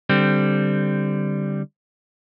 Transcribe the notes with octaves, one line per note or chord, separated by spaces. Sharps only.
D3 G3 C4